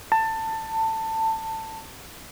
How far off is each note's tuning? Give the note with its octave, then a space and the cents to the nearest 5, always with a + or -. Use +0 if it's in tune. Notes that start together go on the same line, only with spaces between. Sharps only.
A5 +20